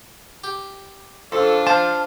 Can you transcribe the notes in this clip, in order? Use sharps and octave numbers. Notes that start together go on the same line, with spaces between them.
G4
F2 D4 F4 A4
F3 C5 F5 A5 F6